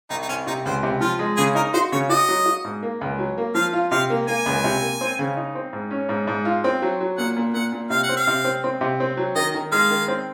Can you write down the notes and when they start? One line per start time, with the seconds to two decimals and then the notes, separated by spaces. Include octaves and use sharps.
0.10 C2 D#4
0.22 D#4
0.28 C2 C#4
0.47 C3 D#4
0.65 C#2 C5
0.83 C3
1.00 F3 F4
1.19 G#3
1.37 C#3 G#4
1.55 D#4 A#4
1.74 F#4 C5
1.92 C#3 C#5
2.09 F#4 D#5
2.29 F#3
2.46 F#4
2.65 G#2
2.83 A#3
3.01 C#2
3.19 F#3
3.38 A#3
3.55 F3 F5
3.73 F4
3.91 C3 F5
4.10 A#3
4.28 A#3 G#5
4.46 C#2
4.64 C3
4.82 A#3
5.01 C4
5.19 C#3
5.36 D#4
5.55 C4
5.73 G#2
5.90 C#4
6.09 G#2
6.27 G#2
6.45 F4
6.64 C4
6.82 F#3
7.00 F#3
7.18 A#2 F#5
7.36 A#2
7.54 A#2 F#5
7.72 A#2
7.90 C3 F5
8.03 F#5
8.09 C4
8.17 F5
8.27 C3
8.44 C4
8.64 C4
8.81 C3
9.00 C4
9.17 F#3
9.35 D#3 D#5
9.54 D#3
9.72 G#3 F5
9.91 D#3
10.08 C4